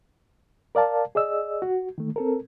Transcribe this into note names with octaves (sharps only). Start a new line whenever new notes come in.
A#4 D5 F5 A5
G#4 D5 D#5 E6
F#4
D#3 A3
C4 A4 A#4